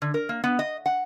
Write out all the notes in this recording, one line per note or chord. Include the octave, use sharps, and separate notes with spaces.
D3
A#4
A#3
B3
D#5
F#5